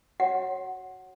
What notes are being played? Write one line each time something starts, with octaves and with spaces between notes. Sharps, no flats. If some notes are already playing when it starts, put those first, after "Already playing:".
F#4 C#5 F#5